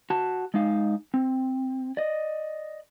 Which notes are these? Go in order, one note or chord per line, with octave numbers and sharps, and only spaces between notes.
F#4 A5
G#3 D#4 F5
C4
D5 D#5